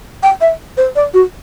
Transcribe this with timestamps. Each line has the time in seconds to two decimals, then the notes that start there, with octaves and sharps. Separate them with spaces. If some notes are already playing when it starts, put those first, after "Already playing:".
0.23 G5
0.41 E5
0.77 C5
0.96 D5
1.14 F#4